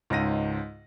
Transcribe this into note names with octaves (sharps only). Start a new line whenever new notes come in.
C#2 G#2 A#6 D#7